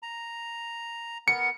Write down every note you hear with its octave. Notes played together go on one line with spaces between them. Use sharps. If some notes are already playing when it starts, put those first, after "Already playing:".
A#5
B3 A#4 C#7